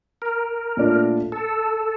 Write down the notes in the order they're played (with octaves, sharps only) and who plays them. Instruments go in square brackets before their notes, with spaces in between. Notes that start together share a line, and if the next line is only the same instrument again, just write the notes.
[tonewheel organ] A#4
[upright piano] A#2 A3 D4 F4
[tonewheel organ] A4